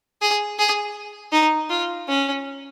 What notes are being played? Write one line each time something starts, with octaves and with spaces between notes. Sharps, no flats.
G#4
G#4
D#4
F4
C#4